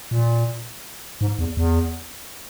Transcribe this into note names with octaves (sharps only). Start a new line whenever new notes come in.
A#2
G#2
E2
E2